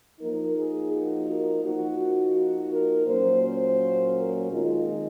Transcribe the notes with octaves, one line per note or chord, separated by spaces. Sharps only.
F3 A#3 D#4 A#4
G#4
F#4
A#4
F3 A#3 D#4 F#4
F#4
A#4
A#2 F#3 A#3 C#4 C5
C5
A#4
D#3 G#3 C4 D#4 F4